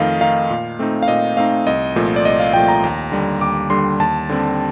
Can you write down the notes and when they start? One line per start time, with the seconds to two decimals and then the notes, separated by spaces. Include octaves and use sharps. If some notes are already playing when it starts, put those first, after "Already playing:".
Already playing: F2 D#3 A3 D#4 D#5 F5
0.21 D#3 A3 D#4 F5
0.50 A#2
0.79 A3 C4 D#4
1.02 F5
1.08 A#2 D#5
1.37 A3 C4 D#4 F5
1.67 C2 D#5
1.96 A#2 F3 A3
2.16 D5
2.25 C2 D#5
2.40 F5
2.54 A#2 F3 A3 G5
2.68 A#5
2.84 D#2
3.12 D3 G3
3.41 D#2 D6
3.70 D3 G3 C6
4.00 D#2 A5
4.29 D3 G3 C4